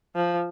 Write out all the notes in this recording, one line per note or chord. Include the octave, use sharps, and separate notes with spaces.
F3